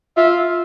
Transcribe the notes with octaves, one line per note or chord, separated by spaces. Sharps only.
F4 E5